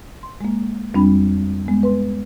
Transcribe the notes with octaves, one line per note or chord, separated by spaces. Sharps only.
C6
G#3 A#3
F2 G3 C4 D4 B5
G#3 B3
B4 C6